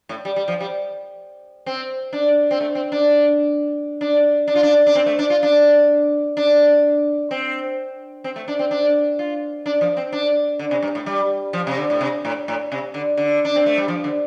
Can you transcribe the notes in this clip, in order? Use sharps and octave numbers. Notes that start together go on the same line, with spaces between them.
A2
G3
G3
F3
G3
C4
D4
C4
A3
C4
D4
D4
D4
F4
D4
D4
C4
A3
D4
F4
D4
D4
C4
C4
A3
D4
C4
D4
F4
D4
F3
C4
D4
D3
C3
G2
A2
G3
F3
C3
D3
A2
C3
A2
A2
C3
D3
D3
D4
C4
A3
G3
F3
D3